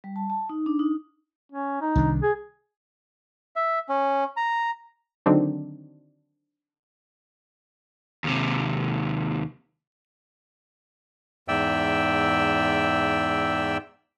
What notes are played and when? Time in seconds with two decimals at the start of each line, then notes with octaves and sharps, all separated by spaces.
0.04 G3
0.16 A5
0.30 A5
0.49 D#4
0.66 D4
0.79 D#4
1.52 C#4
1.81 D#4
1.95 C2 D#3 D4
2.23 G#4
3.56 E5
3.89 C#4
4.37 A#5
5.26 D3 D#3 F#3 C4 D4
8.24 D#2 C3
11.48 E2 G#2 D5 E5 G5 E6